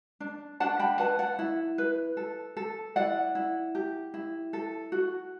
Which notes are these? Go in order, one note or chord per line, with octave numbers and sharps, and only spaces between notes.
D4
D4 F#5 A5
G5 B5
B4 F#5 A5
D5 F#5
E4
B4
A4
A4
E4 D5 F#5
E4
G4
E4
A4
F#4